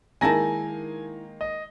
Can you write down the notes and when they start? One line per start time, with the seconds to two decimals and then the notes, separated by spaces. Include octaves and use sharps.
0.21 D#3 G#3 A#3 D#4 E4 G#5 A5 A#6
1.41 D#5